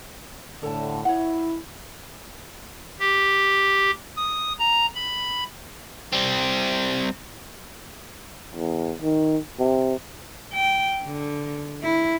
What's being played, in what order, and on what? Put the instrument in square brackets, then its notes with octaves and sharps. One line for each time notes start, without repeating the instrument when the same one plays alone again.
[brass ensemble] A2 D3 [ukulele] A4 A5
[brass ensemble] E4 [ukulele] C#5 F#5
[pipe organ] G4
D#6
A#5
B5
[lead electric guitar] G3 C4
[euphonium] E2
D#3
C3
[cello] G5
D3
E4